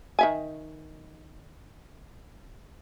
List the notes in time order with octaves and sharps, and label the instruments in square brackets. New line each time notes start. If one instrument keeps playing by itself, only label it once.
[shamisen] D#3 E5 G#5